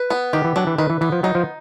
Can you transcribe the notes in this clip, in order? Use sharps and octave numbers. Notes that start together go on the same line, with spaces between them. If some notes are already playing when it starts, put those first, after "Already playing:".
Already playing: B4
B3
D#3 G4
E3
F#3 D4
E3
D#3 B4
E3
E3 B3
F3
F#3 D#4
F3